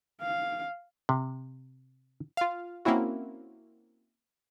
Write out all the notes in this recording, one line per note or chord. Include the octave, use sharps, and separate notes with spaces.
F5
C3
F4 F5
A#3 C4 C#4 E4 F#4